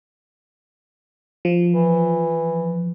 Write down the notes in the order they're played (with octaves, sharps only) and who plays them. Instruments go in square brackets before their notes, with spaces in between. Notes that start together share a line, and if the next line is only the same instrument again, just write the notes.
[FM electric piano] F3
[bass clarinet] E3